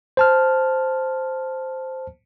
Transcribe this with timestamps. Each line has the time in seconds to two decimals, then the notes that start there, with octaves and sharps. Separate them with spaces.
0.17 C5 A5 F6